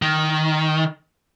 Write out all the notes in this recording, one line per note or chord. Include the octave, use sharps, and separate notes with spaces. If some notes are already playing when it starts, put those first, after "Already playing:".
D#3